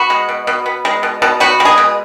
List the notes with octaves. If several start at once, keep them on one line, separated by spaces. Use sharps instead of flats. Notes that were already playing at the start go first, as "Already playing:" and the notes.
Already playing: B3 F#4
G#3
B2
B2
B3
G#3
B2
B2
B3 F#4
G#3
G#4
B2